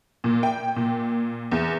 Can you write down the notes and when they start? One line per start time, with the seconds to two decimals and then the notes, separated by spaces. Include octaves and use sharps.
0.24 A#2
0.43 G5
0.76 A#2
1.51 E2